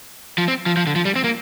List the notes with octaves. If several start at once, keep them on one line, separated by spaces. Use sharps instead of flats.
F3
C4
F3
F3
D3
F3
G3
C4
A#3